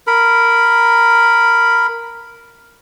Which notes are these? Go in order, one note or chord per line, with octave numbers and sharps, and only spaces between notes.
A#4 B5